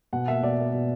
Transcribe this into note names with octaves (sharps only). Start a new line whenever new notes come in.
B2 F#5
A#3 E5
B2 D5
A#3
B2